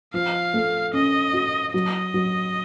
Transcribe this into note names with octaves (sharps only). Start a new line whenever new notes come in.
F3 F5
A3
C#4 D#5
F#4
F#3 D#5
F#3